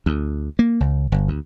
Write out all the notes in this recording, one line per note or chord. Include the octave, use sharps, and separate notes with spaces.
D2
A#3
C#2
G1
D2